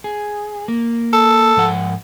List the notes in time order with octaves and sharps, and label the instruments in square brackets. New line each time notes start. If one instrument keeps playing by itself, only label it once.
[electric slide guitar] G#4
A#3
[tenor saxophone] A4
[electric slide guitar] G#2 F3 F#5